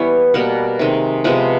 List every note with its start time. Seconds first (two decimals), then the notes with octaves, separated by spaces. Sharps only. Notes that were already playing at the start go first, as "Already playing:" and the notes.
Already playing: E3 G3 B3 C#5
0.34 B2 G3 A#3 F#5
0.79 C3 D#3 G#3
1.24 C3 F3 G#3 B3 F#5